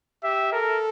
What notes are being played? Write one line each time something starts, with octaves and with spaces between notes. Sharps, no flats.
G4 E5
A4 A#4